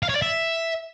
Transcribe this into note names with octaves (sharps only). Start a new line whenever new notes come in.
F5
C#5
D5
E5